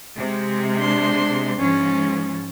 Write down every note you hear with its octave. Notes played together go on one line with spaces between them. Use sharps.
C3 G#3
D4 C6
G#2 F3 C#4